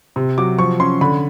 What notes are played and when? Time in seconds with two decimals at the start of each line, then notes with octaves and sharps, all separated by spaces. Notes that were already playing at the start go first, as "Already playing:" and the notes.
0.16 C3
0.38 F#3 D6
0.59 F3 C#6
0.80 C#4 C6
1.01 D3 B5